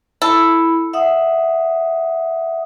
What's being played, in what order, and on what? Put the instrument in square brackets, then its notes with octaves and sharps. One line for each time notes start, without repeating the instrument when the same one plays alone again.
[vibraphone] E4 B5 [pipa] A4
[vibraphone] E5 F#5 D#6